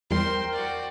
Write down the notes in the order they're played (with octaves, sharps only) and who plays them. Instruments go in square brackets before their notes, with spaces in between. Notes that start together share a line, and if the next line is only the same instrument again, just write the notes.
[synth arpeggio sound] E2 G3 [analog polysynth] A#4 G5 [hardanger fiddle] C5 C6
[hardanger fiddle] F#4 D5